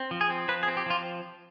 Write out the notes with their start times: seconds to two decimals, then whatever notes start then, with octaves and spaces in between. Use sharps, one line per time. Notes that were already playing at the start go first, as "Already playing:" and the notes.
Already playing: C4
0.11 F3
0.21 G#4
0.30 C4
0.49 F3 B4
0.63 G#4
0.68 C4
0.77 G4
0.86 F3 F4